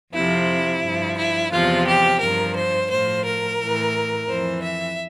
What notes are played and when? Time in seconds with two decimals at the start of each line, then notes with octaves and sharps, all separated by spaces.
0.14 F2 C3 F3 E4
0.84 G2 F3
1.18 E4
1.52 E2 C3 F3 F4
1.87 G4
2.21 G2 F3 A#4
2.56 C5
2.90 A2 F3 C5
3.25 A#4
3.60 A2 E3
4.28 F2 E3 C5
4.63 E5